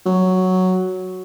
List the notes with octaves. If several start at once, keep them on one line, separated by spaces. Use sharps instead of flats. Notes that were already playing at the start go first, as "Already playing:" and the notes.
F#3